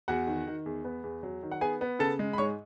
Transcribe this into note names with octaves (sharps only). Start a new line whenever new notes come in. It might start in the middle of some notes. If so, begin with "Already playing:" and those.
E2 F#4 F#5
D#3
D#3
E2
B3
E2
F#3
D#3
F#5
B3 G#4 G#5
B3
C#3 A4 A5
G#3
B5
G#2 C#5 C#6